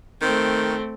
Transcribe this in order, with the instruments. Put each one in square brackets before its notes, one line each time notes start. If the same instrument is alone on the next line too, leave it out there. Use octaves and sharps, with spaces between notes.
[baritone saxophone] D#3 [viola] A3 C4